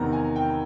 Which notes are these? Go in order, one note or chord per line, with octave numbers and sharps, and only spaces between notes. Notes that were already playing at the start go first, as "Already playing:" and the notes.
Already playing: E2 C3 D#3 A#5
G#5
G5